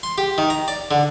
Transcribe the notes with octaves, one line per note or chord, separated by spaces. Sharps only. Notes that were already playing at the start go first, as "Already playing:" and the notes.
C6
G4
D#3
A#5
D5
D3